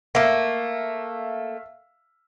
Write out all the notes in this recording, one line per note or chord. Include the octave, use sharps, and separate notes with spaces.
A3 A#3 E5 F5